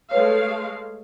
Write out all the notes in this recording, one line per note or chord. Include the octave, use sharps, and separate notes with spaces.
G#3 A3 B4 C#5 F5